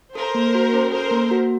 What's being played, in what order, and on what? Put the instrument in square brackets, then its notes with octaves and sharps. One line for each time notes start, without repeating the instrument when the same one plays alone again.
[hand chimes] A4 [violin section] A#4 C5
[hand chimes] A#3
F#4
C#4
[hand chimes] A4 [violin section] A#4 C5
[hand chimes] A#3
F#4